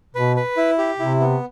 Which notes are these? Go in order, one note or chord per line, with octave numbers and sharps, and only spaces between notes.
B2 B4
B4
E4
G4
C3 E4
B3